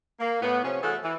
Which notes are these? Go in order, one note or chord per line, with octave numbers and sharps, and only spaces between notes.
A#3
A2 B3
C3 F3 C#4
E3 A3 F#4 G#4 A4
E3